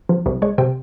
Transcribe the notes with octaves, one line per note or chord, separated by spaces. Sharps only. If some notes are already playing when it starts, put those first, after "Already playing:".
F3
C2
G#3 C#5
C3 G5